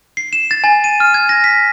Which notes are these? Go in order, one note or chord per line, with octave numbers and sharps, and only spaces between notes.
C7
E7
A6
G#5
D#7
F6
G#6
A#6
B6